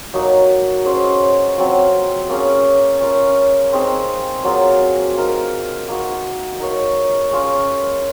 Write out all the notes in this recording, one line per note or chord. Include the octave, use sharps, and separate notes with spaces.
F#3 A#3 D#4 F#4
C#4 G#4 C5 D#5
F#3 C4 F4
A#3 C#4 G#4
C#4 F4 A#4
C4 D#4 G#4 C5
F#3 A#3 F4 G#4
D#4 A#4 F5
A#3 D#4 F#4
D#4 A#4 C#5 F5
C#4 F4 G#4 C#5